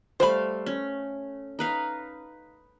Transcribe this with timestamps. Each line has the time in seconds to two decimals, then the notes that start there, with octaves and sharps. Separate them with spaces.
0.20 G3 A3 C5 F5 B5
0.66 C#4
1.59 D#4 B4 F5